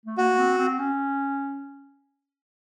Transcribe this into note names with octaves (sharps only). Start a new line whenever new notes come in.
A3
A#3 F#4
C4
C4
C#4